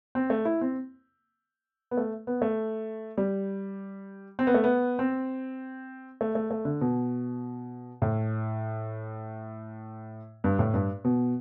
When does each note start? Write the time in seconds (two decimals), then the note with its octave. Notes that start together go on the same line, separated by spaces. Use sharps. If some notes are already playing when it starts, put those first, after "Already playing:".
0.15 C4
0.30 A3
0.45 E4
0.61 C4
1.91 B3
1.97 A3
2.27 B3
2.42 A3
3.18 G3
4.39 C4
4.47 B3
4.54 A3
4.64 B3
4.99 C4
6.21 A3
6.35 A3
6.51 A3
6.65 D3
6.81 B2
8.02 A2
10.44 G2
10.59 A2
10.74 G2
11.04 B2